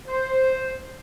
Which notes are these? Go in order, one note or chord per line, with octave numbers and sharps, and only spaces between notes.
C5